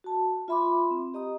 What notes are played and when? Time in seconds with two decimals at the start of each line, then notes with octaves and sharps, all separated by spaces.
0.04 F#4 A5
0.48 F4 E5 B5 C6 D6
0.91 C4
1.14 G4 D#5 A#5 D#6